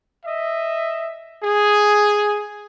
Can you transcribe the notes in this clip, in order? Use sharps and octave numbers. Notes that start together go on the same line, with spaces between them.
D#5 E5
G#4